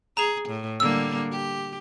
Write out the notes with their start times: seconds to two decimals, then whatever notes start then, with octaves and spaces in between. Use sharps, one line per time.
0.17 G#4 A#5 E7 F7
0.49 A2
0.80 D3 G3 A#3 E6
1.32 G4